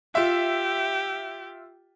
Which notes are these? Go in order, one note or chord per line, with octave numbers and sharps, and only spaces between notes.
F4 G4 E5